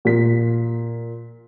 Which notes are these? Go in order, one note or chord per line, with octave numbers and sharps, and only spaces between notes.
A#2 B6